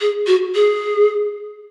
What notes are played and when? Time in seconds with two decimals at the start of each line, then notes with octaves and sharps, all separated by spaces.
0.01 G#4
0.27 F#4
0.55 G#4